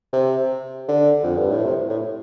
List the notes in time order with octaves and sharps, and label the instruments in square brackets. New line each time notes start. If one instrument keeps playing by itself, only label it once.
[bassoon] C3
D3
F2
G2
A2
C3
A2